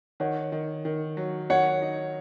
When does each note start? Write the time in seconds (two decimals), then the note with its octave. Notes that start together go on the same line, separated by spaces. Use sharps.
0.20 D#3 C#5 F#5
0.52 D#3
0.85 D#3
1.17 F#3
1.49 D#3 C#5 F#5
1.82 D#4